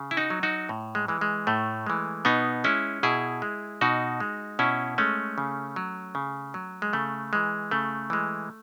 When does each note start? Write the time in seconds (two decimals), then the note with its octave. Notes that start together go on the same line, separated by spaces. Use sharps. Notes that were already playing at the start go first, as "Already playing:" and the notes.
Already playing: C#3
0.11 E4
0.17 D#4 F#4
0.30 F#3
0.43 D#4 F#4
0.69 A2
0.95 G#3
1.08 E3 G#3
1.21 G#3
1.47 A2 A3
1.86 E3 G#3
2.25 B2 B3 D#4
2.64 G#3 C#4 E4
3.03 B2 E4 G#4
3.42 G#3
3.81 B2 D#4 F#4
4.20 G#3
4.59 B2 C#4 E4
4.98 G#3 A3 C#4
5.38 C#3
5.76 F#3
6.15 C#3
6.54 F#3
6.82 G#3
6.93 C#3 A3
7.33 E3 G#3
7.71 C#3 A3
8.10 E3 G#3